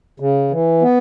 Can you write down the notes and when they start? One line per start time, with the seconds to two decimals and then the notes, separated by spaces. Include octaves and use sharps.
0.20 C#3
0.51 E3
0.82 B3